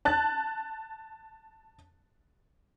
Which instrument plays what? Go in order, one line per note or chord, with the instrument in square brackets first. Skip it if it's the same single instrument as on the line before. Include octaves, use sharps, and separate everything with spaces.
[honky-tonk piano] A5 F#6 A6